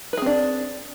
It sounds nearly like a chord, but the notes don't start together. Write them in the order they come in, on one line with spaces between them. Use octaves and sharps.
B4 G#4 C4 D4